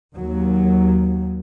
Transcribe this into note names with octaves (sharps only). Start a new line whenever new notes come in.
D#2 F#3